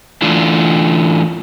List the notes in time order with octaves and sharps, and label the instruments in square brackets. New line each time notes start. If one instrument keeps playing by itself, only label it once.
[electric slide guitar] E3 A3 D4 F4